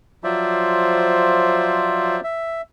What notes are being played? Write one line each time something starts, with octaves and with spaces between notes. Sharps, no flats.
F3 F#3 F4 C5 D5 E5
E5